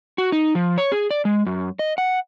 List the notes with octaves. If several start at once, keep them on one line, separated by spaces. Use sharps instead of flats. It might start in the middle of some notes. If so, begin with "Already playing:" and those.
F#4
D#4
F3
C#5
G#4
D5
G#3
F#2
D#5
F#5